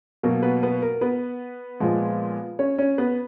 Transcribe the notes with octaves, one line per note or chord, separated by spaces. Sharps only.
B2 F#3 A#3 A#4
B3 B4
B3 B4
A#4
B3 B4
A#2 F3 G#3
C#4 C#5
C#4 C#5
B3 B4